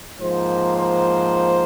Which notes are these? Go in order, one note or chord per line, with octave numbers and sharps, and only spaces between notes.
G#2 F3 A#3 C5
C5